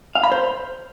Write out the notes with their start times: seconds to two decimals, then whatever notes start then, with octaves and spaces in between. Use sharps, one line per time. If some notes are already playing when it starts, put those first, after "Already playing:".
0.15 F5
0.23 B5
0.32 C5